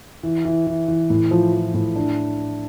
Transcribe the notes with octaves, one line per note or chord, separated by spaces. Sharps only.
E3
E3
E3
E3
A2
F3
F3
A2
D4